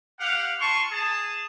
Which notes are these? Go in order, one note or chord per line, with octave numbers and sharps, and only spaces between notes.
G4 F5 F#5
F4 A5 C6 C#6
G#4 A5